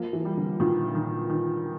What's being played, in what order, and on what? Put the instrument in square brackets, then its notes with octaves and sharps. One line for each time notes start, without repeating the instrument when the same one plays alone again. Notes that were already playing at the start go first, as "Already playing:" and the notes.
Already playing: [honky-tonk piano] F3 [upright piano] A#3
[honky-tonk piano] E3
[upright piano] G3
[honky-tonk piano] D3
[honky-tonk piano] A#2 [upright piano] D#3
[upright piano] D#3
D#3